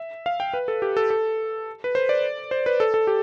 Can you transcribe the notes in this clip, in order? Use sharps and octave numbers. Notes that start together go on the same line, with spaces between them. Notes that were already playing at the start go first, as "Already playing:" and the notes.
Already playing: E5
F5
G5
B4
A4
G4
A4
A4
B4
C5
D5
C5
B4
A4
A4
G4